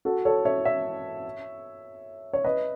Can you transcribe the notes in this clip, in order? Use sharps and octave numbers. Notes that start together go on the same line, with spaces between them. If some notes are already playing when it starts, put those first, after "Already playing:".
F#4 A4
A4 C#5
C#5 E5
C#5 E5
C#5
B4 D#5